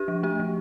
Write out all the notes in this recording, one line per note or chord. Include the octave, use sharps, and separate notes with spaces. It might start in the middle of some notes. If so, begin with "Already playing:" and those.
Already playing: D4 G4
F3
A3 G4
F3